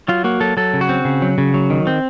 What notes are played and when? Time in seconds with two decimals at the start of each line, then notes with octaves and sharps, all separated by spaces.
0.08 F#3 F4
0.24 A#3 F#4
0.40 F#3 A4
0.57 F#3 A4
0.73 C#3
0.81 F#4
0.89 C4
1.05 C#3
1.22 F#3
1.38 C#3
1.54 F#3
1.70 D#3
1.87 C4